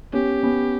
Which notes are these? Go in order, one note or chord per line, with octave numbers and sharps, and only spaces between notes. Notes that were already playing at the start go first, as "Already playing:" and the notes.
B3 C#4 G4
B3 C#4